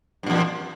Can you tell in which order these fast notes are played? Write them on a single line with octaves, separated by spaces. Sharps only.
G2 A#2 E2